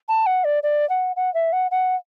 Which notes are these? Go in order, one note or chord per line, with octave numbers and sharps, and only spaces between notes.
A5
F#5
D5
D5
F#5
F#5
E5
F#5
F#5